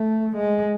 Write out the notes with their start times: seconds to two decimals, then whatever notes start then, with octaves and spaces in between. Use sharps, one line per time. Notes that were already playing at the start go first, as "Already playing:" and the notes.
Already playing: A3
0.37 G#3